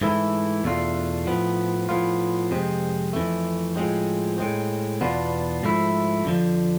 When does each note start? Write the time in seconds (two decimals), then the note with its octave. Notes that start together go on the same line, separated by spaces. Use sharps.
0.02 G#2 E3 A3 E4
0.64 E2 B2 A3 D4 F4
1.26 A2 F3 B3
1.89 A2 F3 B3 F4
2.51 F2 C3 G#3 C4
3.13 F2 E3 A3
3.76 A2 F3 G#3 C4
4.38 A2 G#3 C4
5.01 E2 B2 B3 D4 F4
5.63 G#2 F3 A3 E4
6.25 F2 D3 F3